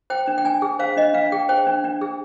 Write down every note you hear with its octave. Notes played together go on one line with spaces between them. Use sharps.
C5 G5
D4
G5
D4 G#5
G#4
C5 F5
D4 D#5
D4 F5
G#4 G5
C5 G5
D4
D4
G#4